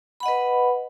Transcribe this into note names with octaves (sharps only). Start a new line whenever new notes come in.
B4 D#5 F#5 B5